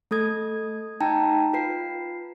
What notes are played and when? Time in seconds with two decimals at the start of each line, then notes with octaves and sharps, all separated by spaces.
0.11 A3 A4 D#6 G#6
1.01 D#4 G5 A5 A#5
1.53 F4 B4 C7